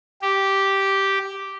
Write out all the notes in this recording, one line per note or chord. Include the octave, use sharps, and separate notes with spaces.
G4